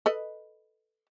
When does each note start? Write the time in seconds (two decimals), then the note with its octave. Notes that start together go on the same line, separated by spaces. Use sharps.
0.06 A4 B4 D#5